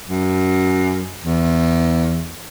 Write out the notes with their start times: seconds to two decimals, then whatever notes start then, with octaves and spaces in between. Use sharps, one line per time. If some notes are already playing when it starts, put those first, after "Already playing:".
0.09 F#2
1.24 E2